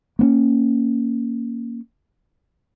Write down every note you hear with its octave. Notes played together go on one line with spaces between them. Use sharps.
A#3 B3 C#4